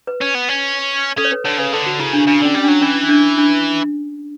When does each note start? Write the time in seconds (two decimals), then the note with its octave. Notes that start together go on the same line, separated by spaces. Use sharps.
0.07 B4
0.21 C#4
0.35 B3
0.49 C#4
1.17 C#4 A4
1.25 C#5
1.32 B4
1.45 D3 C#5
1.58 C#3 B4
1.73 D3 A4
1.86 F#4
1.99 C#3 E4
2.13 D4
2.27 C#3 D4
2.41 D3 C#4
2.54 G3 C#4
2.64 F#3 D4
2.82 E3 C#4
3.09 D4
3.38 D4